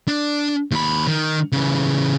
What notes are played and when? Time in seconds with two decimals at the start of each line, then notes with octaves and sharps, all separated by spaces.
0.08 D4
0.71 D#2 B5
1.07 D#3
1.52 C#3 E3